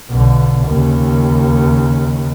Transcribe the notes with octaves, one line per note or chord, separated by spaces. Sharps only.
B1 D3
D#2 C#3